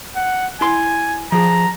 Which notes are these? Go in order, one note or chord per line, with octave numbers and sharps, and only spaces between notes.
F#5
E4 G#5 C6
F3 G#4 A#5